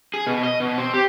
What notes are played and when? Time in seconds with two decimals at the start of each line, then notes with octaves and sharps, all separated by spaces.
0.14 G#4
0.27 B2
0.43 D#5
0.60 B2
0.78 C4
0.94 G4